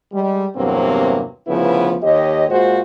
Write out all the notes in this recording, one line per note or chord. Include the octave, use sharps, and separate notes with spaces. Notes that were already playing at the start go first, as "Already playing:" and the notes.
G3 G#3
E2 G2 C3 F#3 A#3 C4
D2 C#3 F3 B3 E4 B4
D#2 G4 C#5 D#5
A#2 G#3 F4 F#4 C5